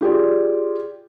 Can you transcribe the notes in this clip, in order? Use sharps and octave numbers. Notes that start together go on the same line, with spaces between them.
F4 G4 G#4 D5